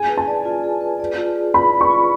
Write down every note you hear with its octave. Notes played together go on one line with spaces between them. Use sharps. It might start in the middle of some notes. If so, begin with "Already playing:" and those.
Already playing: G#4 G#5
B4
A5
D5
F4
G#4
B4
D5
F4
G#4
B4 B5
D5
C#6
F4